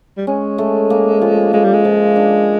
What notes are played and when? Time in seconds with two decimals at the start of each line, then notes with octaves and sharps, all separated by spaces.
0.17 G3
0.27 G#3 C#4
0.58 A3
0.90 A#3
1.21 F3
1.53 G#3 A#3
1.64 G3
1.73 G#3
1.85 F3
2.16 D4